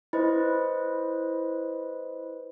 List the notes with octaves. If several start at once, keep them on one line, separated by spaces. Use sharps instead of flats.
E4 B4 C5 D#5